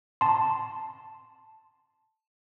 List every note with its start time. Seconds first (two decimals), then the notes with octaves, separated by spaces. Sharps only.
0.21 A5 C6